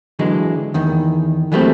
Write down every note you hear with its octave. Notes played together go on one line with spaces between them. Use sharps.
D3 E3 F#3 G#3
E2 D#3
E3 F#3 G3 A3 A#3 C4